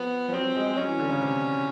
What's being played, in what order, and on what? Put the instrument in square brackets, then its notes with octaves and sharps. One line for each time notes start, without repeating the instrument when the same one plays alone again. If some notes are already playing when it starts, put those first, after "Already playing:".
Already playing: [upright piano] F3 [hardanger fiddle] B3
[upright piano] F3
[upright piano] F#3 [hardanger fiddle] C4
[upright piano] F#3
G#3
G#3
[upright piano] F#3 [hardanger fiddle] C#4
[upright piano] E3
D3
C#3
C3